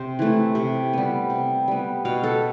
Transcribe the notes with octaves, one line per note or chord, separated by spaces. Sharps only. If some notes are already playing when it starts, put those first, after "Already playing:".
Already playing: C3 C5
E3 A3
C3
G3 B3
C3
G3 B3
B2 F5
A4